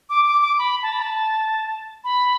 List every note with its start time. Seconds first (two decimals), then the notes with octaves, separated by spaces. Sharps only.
0.10 D6
0.26 D6
0.42 D6
0.59 B5
0.83 A5
0.93 B5
1.02 A5
2.04 B5